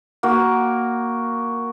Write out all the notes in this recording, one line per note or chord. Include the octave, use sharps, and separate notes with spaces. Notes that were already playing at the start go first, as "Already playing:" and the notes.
A#3 F#4